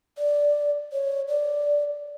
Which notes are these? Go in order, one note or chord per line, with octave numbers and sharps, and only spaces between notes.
D5
C#5
D5